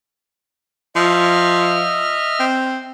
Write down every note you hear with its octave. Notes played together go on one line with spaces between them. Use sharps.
F3 D#5 E5 F6
C4